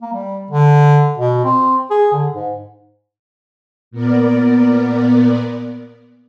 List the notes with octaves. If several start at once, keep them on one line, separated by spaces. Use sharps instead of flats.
A#3
G3
D3
B2
C4
G#4
D3
G#2
A#2 B3 A#4 D5